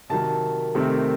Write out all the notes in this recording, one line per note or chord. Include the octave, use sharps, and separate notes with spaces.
C3 D#3 F#3 A5
C3 D#3 A3 C4